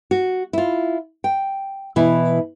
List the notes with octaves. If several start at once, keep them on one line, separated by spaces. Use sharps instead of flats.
F#4
E4 F4
G5
B2 E3 E4